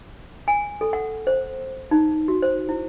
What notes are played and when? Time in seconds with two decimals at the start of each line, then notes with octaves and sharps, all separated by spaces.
0.48 G#5
0.81 A4
0.93 F#5
1.27 C5
1.91 D#4
2.28 F#4
2.42 C5
2.69 E4